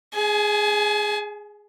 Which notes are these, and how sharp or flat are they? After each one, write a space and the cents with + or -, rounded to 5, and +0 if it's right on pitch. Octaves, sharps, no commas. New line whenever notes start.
G#4 +0 G#5 +45